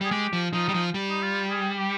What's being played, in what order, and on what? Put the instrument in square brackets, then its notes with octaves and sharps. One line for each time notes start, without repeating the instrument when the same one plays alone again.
[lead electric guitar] G3 [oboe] G#4
[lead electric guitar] G#3 [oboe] G4
[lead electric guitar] F3
[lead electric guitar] F3 [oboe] D#4
[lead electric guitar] G3
F3
G3
[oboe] D#4
F4
G#4
G4